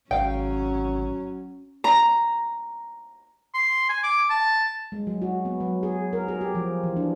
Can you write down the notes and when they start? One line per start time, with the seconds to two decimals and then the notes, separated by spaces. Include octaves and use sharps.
0.11 G#1 F#3 C#4 F5 G5
1.84 A#5
3.54 C6
3.89 G#5
4.03 D6
4.30 A5
4.92 G#3
5.07 F#3
5.22 F#4
5.45 B3
5.60 F#3
5.83 G#4
6.13 A#4
6.28 G#4
6.41 G4
6.55 F3
6.83 E3
6.96 D4